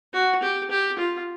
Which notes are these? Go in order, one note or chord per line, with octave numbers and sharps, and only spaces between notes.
F#4
G4
G4
F4